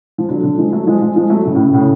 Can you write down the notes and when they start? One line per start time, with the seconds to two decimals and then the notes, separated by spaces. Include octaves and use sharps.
0.18 F3
0.29 D3 F#3
0.43 D3 F#3
0.58 F3 G#3
0.73 F#3 A3
0.87 F3 G#3
1.01 F3 G#3
1.16 F3 G#3
1.30 F#3 A3
1.44 A2 C#3
1.55 A2 C#3
1.73 A2 C#3